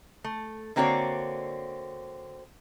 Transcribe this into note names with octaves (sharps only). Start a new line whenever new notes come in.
A3
D3 A#3 C4 F#4 C#5 D5